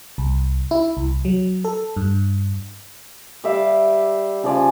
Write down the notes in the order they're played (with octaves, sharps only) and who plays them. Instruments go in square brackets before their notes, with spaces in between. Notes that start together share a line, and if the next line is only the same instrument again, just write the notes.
[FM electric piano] C2
E4
C2
F#3
A4
G2
[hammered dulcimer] G3 D5 E5 F5
C#3 F3 D5 G#5